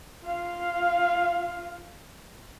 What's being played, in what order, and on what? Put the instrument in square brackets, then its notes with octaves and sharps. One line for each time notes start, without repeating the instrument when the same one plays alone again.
[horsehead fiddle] F4 F5